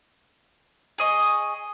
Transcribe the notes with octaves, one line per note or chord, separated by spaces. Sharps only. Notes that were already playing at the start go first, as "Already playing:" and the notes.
G#4 D#5 C#6